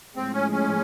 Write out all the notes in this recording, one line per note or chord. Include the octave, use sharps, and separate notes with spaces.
A2 F3 G#3 C4
C#4
C#4